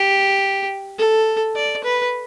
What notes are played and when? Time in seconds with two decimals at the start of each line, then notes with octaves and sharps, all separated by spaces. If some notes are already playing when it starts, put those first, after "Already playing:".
Already playing: G4
0.98 A4
1.55 D5
1.84 B4